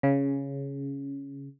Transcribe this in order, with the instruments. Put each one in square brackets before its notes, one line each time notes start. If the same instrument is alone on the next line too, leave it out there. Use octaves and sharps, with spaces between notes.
[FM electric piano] C#3